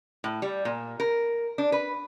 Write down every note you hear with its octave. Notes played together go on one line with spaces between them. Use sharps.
A2
G3
A#2
A#4
D4
B4